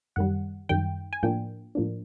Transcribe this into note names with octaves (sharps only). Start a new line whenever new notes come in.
F#2 D#3 G3 F#5
F#2 D#3 G3 G5
G#5
A2 F3 A#3 D4 G5
A2 F3 A#3 D4